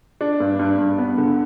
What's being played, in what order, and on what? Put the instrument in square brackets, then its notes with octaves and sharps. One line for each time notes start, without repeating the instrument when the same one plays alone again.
[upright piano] D4
G2
G2
G2
B3
D3